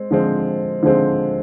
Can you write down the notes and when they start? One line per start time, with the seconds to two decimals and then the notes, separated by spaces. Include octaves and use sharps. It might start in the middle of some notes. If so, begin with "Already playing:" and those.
Already playing: G#3 C4
0.11 D3 F3 G#3 C4
0.83 D3 F3 G#3 C4